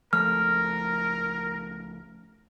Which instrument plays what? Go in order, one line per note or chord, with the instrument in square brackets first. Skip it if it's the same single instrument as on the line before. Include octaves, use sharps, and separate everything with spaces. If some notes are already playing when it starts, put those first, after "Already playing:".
[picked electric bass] C#2 F3 A3 [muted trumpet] A#4 [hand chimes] F6